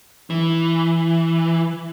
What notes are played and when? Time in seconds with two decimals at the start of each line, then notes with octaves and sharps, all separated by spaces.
0.30 E3